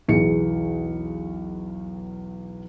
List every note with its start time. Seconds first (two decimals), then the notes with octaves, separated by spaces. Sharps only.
0.08 B1 E2 G#4 C#7